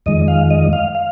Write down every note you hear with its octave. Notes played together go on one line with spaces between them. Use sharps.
F2 D#3 G#3 D#5
F5
D#5
F5
F5